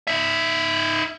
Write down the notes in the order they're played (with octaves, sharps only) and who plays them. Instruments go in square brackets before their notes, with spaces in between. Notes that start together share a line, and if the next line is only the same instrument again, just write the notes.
[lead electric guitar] D#4 E5